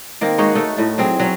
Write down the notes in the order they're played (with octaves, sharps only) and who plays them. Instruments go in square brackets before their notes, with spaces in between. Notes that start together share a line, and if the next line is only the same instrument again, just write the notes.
[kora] D#3 A#3 C4
G#3 D#4 F#4 C#5
A3 D#4 E5
A2 A3
F#3 C4 G#4
F#3 C#4